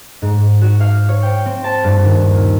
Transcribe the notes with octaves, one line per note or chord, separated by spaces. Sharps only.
G#2
F#4
F5
C#5
G5
C4
A5
G2
D#2
A#2